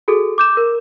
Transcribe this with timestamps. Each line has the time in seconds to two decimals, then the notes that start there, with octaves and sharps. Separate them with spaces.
0.08 F#4 G#4 A4
0.38 D6 G6 E7
0.57 A#4